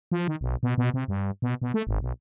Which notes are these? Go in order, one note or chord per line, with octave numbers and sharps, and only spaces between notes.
F3
D#3
B1
B2
B2
C3
G2
B2
B2
A3
G#1
B1